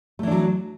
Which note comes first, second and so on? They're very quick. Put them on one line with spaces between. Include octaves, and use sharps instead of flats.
A3 E3 D4 F#3